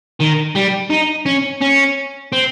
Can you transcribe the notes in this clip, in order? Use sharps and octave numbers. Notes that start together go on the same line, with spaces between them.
D#3
G3
D#4
C#4
C#4
C4